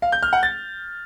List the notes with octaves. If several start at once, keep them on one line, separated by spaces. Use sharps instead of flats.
F5
G6
F6
F#5
A6